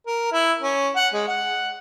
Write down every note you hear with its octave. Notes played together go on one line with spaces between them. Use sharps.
A#4
E4
C#4
F#5
G#3
F#5